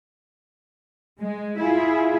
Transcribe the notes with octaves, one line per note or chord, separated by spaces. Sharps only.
G#3
E4 F4 G#4